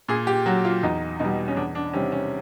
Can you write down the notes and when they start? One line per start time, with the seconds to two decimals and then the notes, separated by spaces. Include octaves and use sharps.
0.08 A#2 G#4
0.27 G4
0.46 F#3 F#4
0.65 F4
0.83 E2 D#4
1.19 B2 G3 D#4
1.48 C#4
1.56 E2 D4
1.75 D4
1.93 C3 D#3 G3 C#4
2.12 C#4